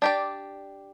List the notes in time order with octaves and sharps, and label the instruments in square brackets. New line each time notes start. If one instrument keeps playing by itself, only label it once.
[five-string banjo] D4 G4 D5